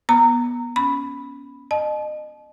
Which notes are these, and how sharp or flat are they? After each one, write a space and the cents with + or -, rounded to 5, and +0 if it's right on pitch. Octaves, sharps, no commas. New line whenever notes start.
B3 -25 A#5 -20
C#4 +15 B5 +0
D#5 -35 A5 -40